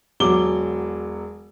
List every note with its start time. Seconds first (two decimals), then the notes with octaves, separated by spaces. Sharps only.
0.20 E1 F#3 D6 G7